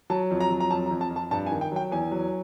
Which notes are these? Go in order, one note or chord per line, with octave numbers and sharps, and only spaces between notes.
F#3 A5
F2
A#5
F#3
A#5
F2 A5
A#5
F2
A5
F2
A5
G2 A5
G#5
D#3
G5
F#3 G5
E2 G#5
F#3